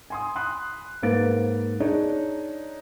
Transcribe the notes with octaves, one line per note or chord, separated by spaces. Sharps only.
G#5 C6 D#6
B5 C6 D#6 F#6
G#2 A#3 B4 C5 A6 D7
D4 D#4 G#4 C#5